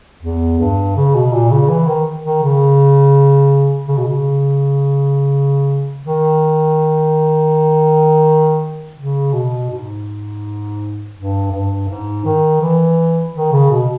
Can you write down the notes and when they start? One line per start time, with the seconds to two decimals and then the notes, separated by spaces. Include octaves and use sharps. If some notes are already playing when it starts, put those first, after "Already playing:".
0.23 E2
0.60 G2
0.96 C#3
1.15 B2
1.33 A#2
1.51 C#3
1.68 E3
1.87 D#3
2.24 D#3
2.42 C#3
3.88 C#3
3.98 B2
4.08 C#3
6.06 D#3
8.98 C#3
9.33 B2
9.70 G#2
11.16 G2
11.52 G2
11.88 G#2
12.25 D#3
12.61 E3
13.35 D#3
13.52 C#3
13.70 B2